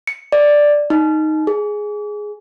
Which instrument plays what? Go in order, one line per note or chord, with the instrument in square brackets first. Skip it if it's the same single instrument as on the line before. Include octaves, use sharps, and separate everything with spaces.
[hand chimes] C#7
D5
D#4
G#4